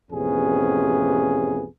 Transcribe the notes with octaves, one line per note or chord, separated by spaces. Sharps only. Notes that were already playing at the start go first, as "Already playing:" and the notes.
A1 F2 C3 B3 C#4 G#4